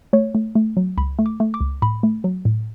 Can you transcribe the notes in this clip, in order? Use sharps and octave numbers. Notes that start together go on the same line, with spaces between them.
A3 C#5
A3
A3
F#3
C#2 B5
A3
D6
A3
D6
C#2
A2 B5
A3
F#3
A2